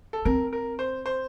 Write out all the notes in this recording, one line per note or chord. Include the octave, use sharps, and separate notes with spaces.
A4
C4 A#4
A#4
C5
C5